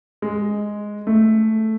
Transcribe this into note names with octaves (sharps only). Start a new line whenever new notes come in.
G#3
A3